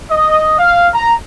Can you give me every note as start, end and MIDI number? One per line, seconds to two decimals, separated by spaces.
0.11 0.58 75
0.59 0.88 77
0.94 1.13 82